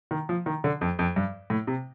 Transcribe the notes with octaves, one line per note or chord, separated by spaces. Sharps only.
D#3
F3
D#3
D3
F2
F2
G2
A2
C3